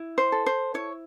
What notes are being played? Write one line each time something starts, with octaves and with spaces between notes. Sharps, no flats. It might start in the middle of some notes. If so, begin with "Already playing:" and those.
Already playing: E4
C5
A4
C5
E4 C#5